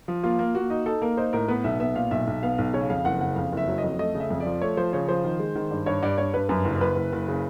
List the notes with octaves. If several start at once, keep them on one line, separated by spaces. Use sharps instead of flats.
F3
A#3 F4
A#3
A#3 F#4
D#4
D#4 A4
A#3 A#4
D#4 C5
A2 A#4
B3 B4
B1 E5
B3 E5
A#2 F5
B1 E5
B1
B3 F5
B1
C#3 C#5
F2 F5
F#1 F#5
C#3 F#5
F2 F5
F#1 E5
F#3
D#5
F2
A3 D#5
C#3
E5
F2
D5
F3
A3 C#5
F3 C5
C#3 C#5
F3 C5
D#3
G#3
D#3
G2
G2 C#5
G2 D5
G2 C#5
G2 B4
F#2 B4
F#1
F#1 B4
F#1
F#1
C#3